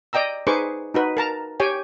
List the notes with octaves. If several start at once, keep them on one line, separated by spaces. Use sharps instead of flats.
D5 D#5 G5 A#5 E6
D#4 G#4 B4 C5 C#6 D6
D#4 F#4 B4
A#4 A5 A#5
G4 C#5 G5 G#5